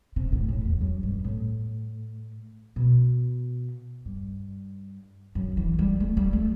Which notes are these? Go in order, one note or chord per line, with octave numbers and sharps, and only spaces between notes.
C3
A2
A2
E2
F#2
G2
A2
B2
G2
F#2
E3
G3
A3
G3
A3